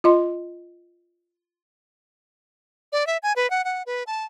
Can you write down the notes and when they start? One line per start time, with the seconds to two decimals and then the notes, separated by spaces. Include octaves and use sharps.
0.04 F4 D#5 C6
2.93 D5
3.07 E5
3.23 G#5
3.36 B4
3.50 F#5
3.65 F#5
3.86 B4
4.07 A5